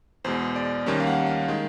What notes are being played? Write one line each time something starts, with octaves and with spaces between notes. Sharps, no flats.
E2 B2 G#3 C5
D5
D#2 D#3 G3 A#3 C#4
F5
F#5
F5
D#3 G#3